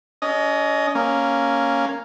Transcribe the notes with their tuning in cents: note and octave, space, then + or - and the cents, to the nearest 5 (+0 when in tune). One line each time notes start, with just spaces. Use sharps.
C#4 +35 D#5 +0
A#3 +0 C#4 +0